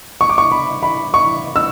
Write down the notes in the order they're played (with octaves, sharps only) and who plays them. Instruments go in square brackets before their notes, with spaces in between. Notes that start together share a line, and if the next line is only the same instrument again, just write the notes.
[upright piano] C#6
D6
C#6
B5
B5
C#6
E6